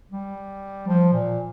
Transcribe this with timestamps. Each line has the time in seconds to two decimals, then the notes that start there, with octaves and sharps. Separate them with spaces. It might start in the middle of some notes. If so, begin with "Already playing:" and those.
0.11 G3
0.87 F3
1.12 A#2